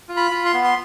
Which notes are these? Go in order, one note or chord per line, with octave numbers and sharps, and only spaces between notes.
F4
B5
F4
C6
B3
C6